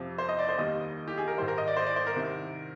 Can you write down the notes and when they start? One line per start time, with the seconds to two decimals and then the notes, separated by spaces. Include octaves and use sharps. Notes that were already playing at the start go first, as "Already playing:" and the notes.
Already playing: F2 C3 F3
0.18 C5
0.29 D#5
0.39 D5
0.49 C5
0.58 D#2 D#3 G3 D#5
1.08 G4
1.18 G#4
1.28 A#4
1.37 G#2 D#3 G3 C5
1.48 A#4
1.58 D#5
1.68 D5
1.77 C5
1.87 D5
1.96 C5
2.07 A#4
2.16 C2 C3 D#3